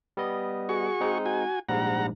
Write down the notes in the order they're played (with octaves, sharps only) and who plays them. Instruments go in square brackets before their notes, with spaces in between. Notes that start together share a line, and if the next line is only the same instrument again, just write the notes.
[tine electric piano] G3 B3 D#5
[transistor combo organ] F#4 G#4 C#6
[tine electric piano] G#3 C4 D#4
[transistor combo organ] F#4 G#5
[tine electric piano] A#1 G#2 G3 [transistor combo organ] F#5 A#5